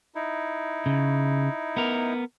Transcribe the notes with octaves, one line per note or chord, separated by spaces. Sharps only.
D#4 E4
C#3
B3 A#4